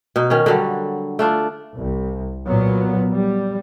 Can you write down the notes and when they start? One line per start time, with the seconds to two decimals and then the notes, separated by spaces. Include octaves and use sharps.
0.16 B2 D#4
0.30 D#3 C#4
0.46 D3 F#3 G3
1.19 A3 D4 F4
1.78 C2
2.47 A#2 F#3 B3
3.11 G3